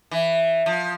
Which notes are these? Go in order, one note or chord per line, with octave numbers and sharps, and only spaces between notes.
E3
F3